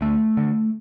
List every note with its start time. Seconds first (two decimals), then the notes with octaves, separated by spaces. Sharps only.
0.01 D2 A3
0.37 D3